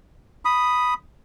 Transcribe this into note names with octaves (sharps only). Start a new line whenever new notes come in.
B5 D#6